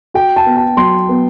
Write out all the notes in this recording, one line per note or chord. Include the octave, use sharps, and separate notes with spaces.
F#4 G5
A5
B3
A5
F#3 C6
B3